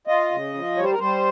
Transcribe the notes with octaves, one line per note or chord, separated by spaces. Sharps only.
F4 D#5
C#3
F3
G3 C#5
C5
A#4
G3 C5